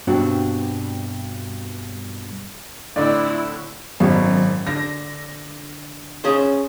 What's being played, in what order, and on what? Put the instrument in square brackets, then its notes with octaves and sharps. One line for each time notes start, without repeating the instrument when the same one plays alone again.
[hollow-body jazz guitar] G2 B2 C4 D4 F#4
[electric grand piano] A2 D3 [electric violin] C4 E4 [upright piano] D5
[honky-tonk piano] G#1 F#2 [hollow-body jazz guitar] B2
[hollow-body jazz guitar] D3 [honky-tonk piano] A#6
[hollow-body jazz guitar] C#4 G#4 C5